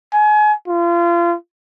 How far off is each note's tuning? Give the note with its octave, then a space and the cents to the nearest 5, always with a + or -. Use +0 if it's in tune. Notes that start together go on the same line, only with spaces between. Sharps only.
G#5 +30
F4 -30